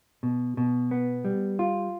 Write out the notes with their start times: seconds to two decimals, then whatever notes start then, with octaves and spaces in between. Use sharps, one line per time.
0.23 B2
0.57 B2
0.91 B3
1.25 G3
1.59 F4